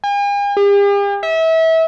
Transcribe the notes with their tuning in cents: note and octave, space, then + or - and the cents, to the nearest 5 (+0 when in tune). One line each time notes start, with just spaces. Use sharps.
G#5 -45
G4 +45
E5 -30